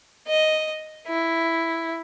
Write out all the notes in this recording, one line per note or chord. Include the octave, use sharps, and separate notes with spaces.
D#5
E4